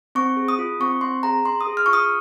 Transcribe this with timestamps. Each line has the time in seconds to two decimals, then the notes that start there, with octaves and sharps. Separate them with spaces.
0.15 C4 C#6
0.37 G#4
0.48 D#6
0.59 F4
0.80 C4 C#6
1.01 C4 C6
1.23 G#4 A#5
1.44 C#4 C6
1.61 D#6
1.67 G#4
1.77 F6
1.86 F4 C#6
1.93 D#6